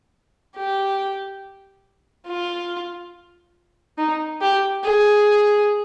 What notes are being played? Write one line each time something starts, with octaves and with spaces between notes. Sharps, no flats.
G4
F4
D#4
G4
G#4